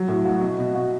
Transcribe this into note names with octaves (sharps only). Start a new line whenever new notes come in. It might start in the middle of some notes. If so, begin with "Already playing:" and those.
Already playing: F#3
A2
F#4
B2
B2
F#4